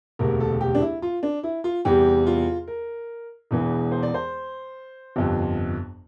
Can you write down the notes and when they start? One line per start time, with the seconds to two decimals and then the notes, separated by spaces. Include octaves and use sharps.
0.19 E1 D2 C3 A#4
0.40 A4
0.61 G4
0.75 D4
0.81 E4
1.02 F4
1.23 D4
1.43 E4
1.64 F4
1.85 E2 C3 G3 G4
2.26 F4
2.67 A#4
3.51 E1 E2 E3
3.92 C5
4.03 D5
4.14 C5
5.16 G1 F2 C3